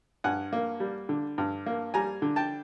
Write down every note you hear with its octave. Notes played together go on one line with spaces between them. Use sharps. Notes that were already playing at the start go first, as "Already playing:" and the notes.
G2 F#5 G#5
A#3
G3
D3
G2
A#3
G3 G#5 A#5
D3
G5 A5